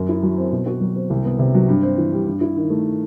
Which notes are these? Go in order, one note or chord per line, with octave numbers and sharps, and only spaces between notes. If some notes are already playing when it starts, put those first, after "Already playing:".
Already playing: F#2
E4
F#3
C4
B2
F#4
F#3
C4
C2
B3
C3
F#3
G2
C4
E3
G3
G2
E4
D#3
A3